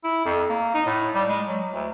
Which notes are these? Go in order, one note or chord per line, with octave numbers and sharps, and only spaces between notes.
E4
F2
A#3
D#4
A2
G3
G#3
F#3
D2